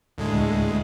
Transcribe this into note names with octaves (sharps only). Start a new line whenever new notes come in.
D2 A2 G#3